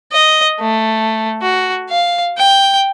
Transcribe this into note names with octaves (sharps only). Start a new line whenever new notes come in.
D#5
A3
F#4
F5
G5